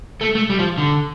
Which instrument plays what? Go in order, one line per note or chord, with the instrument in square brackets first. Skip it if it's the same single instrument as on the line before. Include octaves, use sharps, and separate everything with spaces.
[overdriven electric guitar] A3
A3
G3
F3
D3